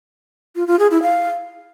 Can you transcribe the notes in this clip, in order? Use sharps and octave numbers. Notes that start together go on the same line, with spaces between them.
F4
F4
G#4
E4
F5